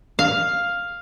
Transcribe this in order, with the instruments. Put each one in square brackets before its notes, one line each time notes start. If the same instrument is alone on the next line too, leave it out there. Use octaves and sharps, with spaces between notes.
[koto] F5